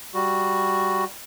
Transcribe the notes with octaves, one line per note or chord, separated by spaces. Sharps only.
G3 F#4